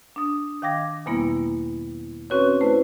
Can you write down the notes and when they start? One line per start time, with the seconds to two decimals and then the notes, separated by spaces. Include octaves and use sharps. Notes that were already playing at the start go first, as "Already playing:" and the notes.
0.16 D4 D#6
0.62 D#3 F5 G5 D6 G#6 A#6
1.06 E2 B2 G3 A#3 B3 E4
2.30 C4 C#4 F#4 B4 C#5
2.61 A3 E4 B4 C5